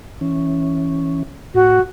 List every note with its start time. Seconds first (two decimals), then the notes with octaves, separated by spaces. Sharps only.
0.21 E3 C#4
1.54 A2 F#4